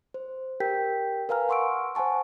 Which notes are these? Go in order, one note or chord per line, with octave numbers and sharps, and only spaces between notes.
C5
G4 A#4 G5 G6 B6
A#4 B4 F5 G#5 A#5 F6
F#5 C6 C#6 E6 D7
C5 F#5 G#5 A5 C#6